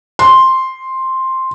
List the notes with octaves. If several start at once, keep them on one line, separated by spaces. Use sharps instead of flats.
C6